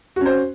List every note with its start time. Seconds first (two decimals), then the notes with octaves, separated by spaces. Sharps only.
0.16 F#4
0.21 C#4
0.26 C5